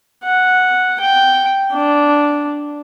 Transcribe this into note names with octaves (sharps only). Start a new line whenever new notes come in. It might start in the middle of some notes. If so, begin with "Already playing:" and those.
F#5
G5
D4